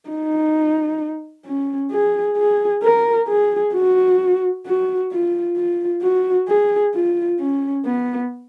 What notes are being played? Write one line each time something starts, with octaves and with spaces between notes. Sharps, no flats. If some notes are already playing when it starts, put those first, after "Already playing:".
D#4
C#4
G#4
G#4
A#4
G#4
F#4
F#4
F4
F4
F#4
G#4
F4
C#4
B3